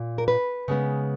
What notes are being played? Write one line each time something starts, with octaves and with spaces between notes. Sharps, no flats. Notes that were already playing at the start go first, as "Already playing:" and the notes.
Already playing: A#2
A#4
B4
C#3 G#3 B3